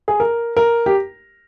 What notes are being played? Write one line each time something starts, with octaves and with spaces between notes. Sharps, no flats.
G#4
A#4
A#4
G4